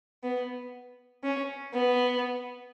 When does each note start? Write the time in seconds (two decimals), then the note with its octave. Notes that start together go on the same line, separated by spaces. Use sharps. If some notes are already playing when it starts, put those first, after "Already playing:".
0.23 B3
1.23 C#4
1.73 B3